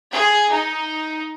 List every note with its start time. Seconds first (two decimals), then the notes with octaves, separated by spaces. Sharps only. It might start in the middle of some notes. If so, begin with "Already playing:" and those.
0.13 G#4
0.52 D#4